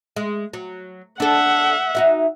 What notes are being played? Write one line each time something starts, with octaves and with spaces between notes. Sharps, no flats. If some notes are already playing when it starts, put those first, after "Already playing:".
G#3
F#3
D4 A4 E5 F#5
D#4 F#4 E5